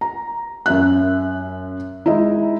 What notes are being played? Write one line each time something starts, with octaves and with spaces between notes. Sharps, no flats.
A#5
F#2 E5 F#6
G#3 D#4 E4